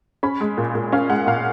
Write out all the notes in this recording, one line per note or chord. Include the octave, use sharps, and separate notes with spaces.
C#4 B5
G#3
A#2
A#2
C#4 F5
G#3 F#5
A#2 F5